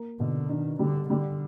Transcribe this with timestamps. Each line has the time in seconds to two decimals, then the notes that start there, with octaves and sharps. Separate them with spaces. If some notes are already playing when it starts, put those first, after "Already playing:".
Already playing: A#3
0.19 B2 D3
0.49 D#3 D4
0.79 D3 G3
1.09 D3 G3